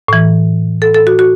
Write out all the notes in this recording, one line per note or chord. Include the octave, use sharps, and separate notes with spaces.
A2 E3
A4
A4
F#4
F#4